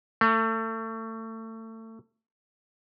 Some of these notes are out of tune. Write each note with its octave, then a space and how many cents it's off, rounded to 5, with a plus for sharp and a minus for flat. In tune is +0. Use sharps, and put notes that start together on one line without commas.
A3 +30